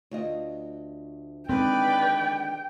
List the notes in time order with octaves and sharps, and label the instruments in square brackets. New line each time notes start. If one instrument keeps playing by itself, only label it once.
[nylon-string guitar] D2 F4 D#5
[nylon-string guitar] D3 D#3 G#3 [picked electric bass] C4 [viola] B4 D5 [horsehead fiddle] G5